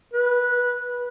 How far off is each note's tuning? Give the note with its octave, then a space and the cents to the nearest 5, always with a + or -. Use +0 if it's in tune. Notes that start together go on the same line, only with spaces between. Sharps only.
B4 -15